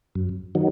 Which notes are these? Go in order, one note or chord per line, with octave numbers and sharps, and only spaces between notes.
F#2
D#3 F#3